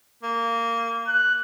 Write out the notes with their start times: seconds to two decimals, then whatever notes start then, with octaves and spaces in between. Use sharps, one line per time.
0.23 A#3
1.08 F#6